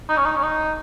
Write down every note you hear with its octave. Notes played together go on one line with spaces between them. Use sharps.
D#4
C#4
D#4
C#4
D#4